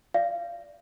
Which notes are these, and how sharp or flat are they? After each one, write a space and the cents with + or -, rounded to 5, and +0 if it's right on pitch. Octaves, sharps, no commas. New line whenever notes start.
D5 +0 F5 -20